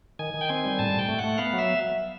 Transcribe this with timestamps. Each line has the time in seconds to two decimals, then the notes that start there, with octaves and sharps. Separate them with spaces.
0.19 D#3 G#5
0.34 D#3
0.41 G5
0.49 C4 G#5
0.65 G3
0.79 A2 A5
0.94 A2
0.99 G5
1.08 A3
1.19 A3 F#5
1.38 B3 F5
1.53 F#3
1.59 E5